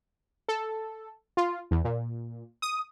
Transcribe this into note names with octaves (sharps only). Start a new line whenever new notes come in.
A4
F4
E2
A#2
D#6